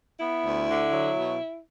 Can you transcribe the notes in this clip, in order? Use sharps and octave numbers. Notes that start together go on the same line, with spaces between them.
B3 E4
D2
D3
F#3
B2